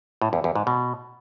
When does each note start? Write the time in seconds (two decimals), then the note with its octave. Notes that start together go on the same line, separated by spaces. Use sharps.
0.22 A2
0.33 E2
0.44 E2
0.56 G#2
0.67 B2